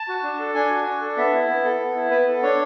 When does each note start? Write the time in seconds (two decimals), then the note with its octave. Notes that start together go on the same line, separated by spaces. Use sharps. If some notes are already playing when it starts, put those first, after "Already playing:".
Already playing: A5
0.09 F#4
0.23 D4
0.39 A4
0.54 D4 G#5
0.70 F#4
0.87 D4
1.02 A4
1.17 B3 E5
1.33 E4
1.48 B3
1.64 A4
1.79 B3
1.95 E4
2.11 B3 B4
2.27 A4
2.43 D4 C#5